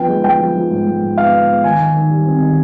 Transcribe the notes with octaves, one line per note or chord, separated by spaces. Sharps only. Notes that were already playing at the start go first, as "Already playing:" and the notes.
Already playing: F3 B3 G5
G#3
G#3 G5
F3
F3
G#2
G#2
G#2
B3 F5
B3
B3
D#3 G#5
D#3
D#3
G3
C4
D#3